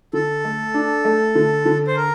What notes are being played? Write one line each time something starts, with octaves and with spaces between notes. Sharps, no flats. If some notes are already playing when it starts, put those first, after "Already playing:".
D3 A4
A3
D4
A3
D3
D3
C5
A#4